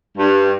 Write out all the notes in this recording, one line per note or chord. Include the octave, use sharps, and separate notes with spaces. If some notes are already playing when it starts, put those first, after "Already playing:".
G2